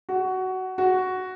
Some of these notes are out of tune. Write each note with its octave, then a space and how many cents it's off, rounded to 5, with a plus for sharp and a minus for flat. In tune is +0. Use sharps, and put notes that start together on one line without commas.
F#4 +15
F#4 +5